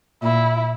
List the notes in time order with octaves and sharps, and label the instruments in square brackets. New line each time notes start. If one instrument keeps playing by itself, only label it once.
[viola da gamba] A#2 [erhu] E4